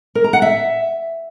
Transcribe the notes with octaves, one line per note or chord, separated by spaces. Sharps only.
A#4
A#5
F#5
E5